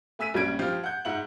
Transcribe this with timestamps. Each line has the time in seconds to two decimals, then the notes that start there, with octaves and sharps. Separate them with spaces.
0.19 A3 G#5 E6 B6 D#7
0.34 A#1 G3 C#4 G#6 D7
0.59 F3 F4 G4
0.84 F#5 G6
1.05 G#2 E5 F#5 F#7